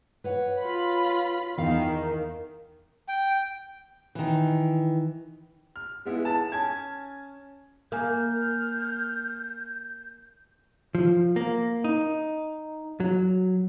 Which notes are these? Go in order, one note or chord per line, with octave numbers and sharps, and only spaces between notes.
B4 C#5 F#5
F4 B5
E2 D#3 F5
G5
D#3 E3
F6
G#3 B3 E4
A5
C#4 G#5 A5 G#6
A#3 A#4 G#5 A#5 F6 G6
F3
A#3
D#4
F#3